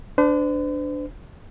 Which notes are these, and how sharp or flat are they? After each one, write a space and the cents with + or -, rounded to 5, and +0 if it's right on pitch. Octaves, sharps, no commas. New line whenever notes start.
D4 +0 C5 -45